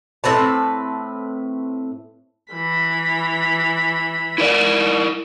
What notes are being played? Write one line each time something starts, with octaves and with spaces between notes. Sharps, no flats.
A2 C4 B4 A5
E3 B5
E4 A#4 D5